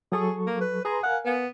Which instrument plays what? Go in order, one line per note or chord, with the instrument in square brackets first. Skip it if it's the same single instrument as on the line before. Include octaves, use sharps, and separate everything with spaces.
[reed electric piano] F#3 A4 C#6 [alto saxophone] G#4
[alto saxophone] A#3
B4
[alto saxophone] G#4 [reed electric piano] B4 A#5 C6
[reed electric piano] A#4 F5 G#5 [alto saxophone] F#5
[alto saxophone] B3